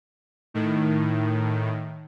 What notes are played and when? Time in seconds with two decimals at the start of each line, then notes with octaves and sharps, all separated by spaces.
0.54 A2 D#3